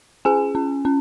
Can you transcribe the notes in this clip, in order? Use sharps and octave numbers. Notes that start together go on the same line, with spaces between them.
C#4 G#4 G#5
C#4
C#4